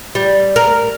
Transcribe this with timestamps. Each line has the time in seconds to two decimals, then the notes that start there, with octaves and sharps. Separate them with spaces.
0.15 G3
0.56 A#4